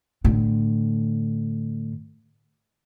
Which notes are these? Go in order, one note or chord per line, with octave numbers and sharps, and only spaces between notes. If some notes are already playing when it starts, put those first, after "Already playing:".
A2 D3